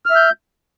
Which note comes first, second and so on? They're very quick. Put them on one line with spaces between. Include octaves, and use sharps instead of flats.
F6 E5 G6